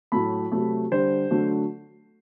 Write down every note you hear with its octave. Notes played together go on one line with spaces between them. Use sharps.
A2 F#3 A3 B5
C3 F#3 A3
D3 G3 C5
D3 F#3 A3